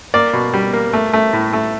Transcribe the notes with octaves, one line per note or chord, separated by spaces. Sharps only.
A#3 D5
B2
G3
A#3
A3
A3
A2
A3